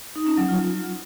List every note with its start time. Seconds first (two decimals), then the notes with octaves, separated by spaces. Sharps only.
0.16 D#4
0.27 C#4
0.38 F#3
0.49 F4